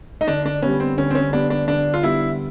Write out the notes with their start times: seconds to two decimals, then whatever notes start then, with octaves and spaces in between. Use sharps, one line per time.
0.21 D#4
0.28 D3 D4
0.46 D4
0.62 G3 B3 C#4
0.80 C4
0.97 D3 C#4
1.10 C4
1.15 C#4
1.33 G3 B3 D4
1.50 D4
1.67 D3 D4
1.94 F4
2.03 G3 B3 E4